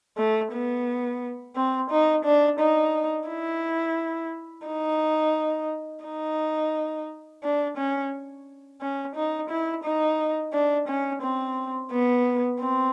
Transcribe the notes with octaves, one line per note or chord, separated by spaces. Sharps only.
A3
B3
C4
D#4
D4
D#4
E4
D#4
D#4
D4
C#4
C#4
D#4
E4
D#4
D4
C#4
C4
B3
C4